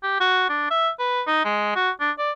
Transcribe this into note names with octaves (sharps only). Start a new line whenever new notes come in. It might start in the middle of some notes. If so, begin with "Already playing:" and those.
G4
F#4
D4
E5
B4
D#4
G#3
F#4
D4
D5